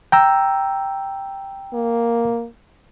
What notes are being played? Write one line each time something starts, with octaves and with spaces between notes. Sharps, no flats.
G5 A#5 E6
A#3